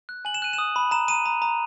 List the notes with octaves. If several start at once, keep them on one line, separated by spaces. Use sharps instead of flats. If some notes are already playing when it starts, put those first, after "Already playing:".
F#6
G#5 F#7
E7
F#6 D#7
E7
D#6
B5
A#5 E7
A#5 D#7
A#5
A#5